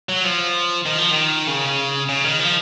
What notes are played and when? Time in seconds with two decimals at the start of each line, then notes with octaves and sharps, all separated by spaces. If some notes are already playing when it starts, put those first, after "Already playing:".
0.09 F#3
0.24 F3
0.86 D#3
0.98 F3
1.11 D#3
1.47 C#3
2.09 C#3
2.24 D#3
2.40 F3